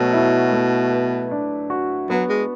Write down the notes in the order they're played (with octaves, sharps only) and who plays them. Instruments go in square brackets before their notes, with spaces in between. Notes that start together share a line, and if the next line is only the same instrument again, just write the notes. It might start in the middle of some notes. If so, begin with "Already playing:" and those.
Already playing: [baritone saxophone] B2 [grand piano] F#3 A3
[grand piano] E4
A3
B4
D4
F#4
[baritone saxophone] F#3 [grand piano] B3
[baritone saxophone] G#3